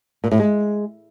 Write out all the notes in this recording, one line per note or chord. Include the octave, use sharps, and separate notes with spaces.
A#2
A2
G#3